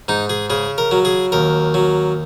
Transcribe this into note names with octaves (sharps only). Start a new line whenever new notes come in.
G#2 D#4
G#4
C#3 G#4
A#4
F#3
G#4
D#2 A#4
F#3